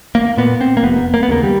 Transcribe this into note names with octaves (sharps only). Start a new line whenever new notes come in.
A#3
A#2 B3
C4
A#3
F1 B3
A#3
B3
D#2 C#3 A#3
G3